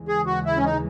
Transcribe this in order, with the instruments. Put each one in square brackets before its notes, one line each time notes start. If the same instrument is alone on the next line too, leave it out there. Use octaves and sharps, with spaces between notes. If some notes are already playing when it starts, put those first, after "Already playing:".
Already playing: [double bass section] D#2 C#3 E3 G#3
[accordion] G#4
F#4
E4
C#4
D#4